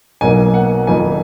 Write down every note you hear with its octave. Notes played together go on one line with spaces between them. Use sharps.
B1 B2 F#3 A#3 G#5
F#5
F#1 F2 D#3 A#3 D#4 G#5